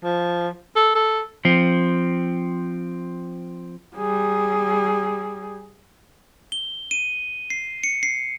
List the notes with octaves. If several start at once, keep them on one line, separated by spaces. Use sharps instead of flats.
F3
A4
A4
F3 C4
G3 G#4
G7
D#7
C7
C#7
C7